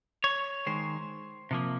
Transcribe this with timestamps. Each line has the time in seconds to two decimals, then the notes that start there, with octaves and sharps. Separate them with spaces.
0.24 C#5
0.66 D#3 G#3 C5
1.51 C3 F3 A#3